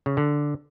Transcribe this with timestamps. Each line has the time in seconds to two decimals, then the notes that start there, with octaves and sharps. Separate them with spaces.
0.06 C#3
0.17 D3